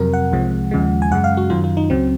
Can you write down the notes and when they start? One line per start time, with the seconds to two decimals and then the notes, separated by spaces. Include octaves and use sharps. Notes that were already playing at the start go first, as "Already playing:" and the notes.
Already playing: F2 C3 F#3 A#4
0.14 F#5
0.32 C2 C3 F3 G#3
0.71 D#2 C#3 F3 G#3
1.02 G#5
1.11 F#2 C#3 G#3 F#5
1.24 F5
1.37 F#4
1.50 F#2 D#3 F#3 F4
1.64 F4
1.77 D#4
1.90 C#2 C#3 F#3 C4